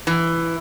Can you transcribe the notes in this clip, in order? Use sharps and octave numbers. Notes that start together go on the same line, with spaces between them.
E3